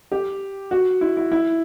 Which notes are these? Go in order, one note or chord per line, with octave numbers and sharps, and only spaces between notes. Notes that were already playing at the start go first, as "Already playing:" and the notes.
G4
F#4
E4
E4
E4